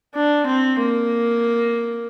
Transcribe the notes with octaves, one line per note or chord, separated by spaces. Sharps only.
D4
C4
A#3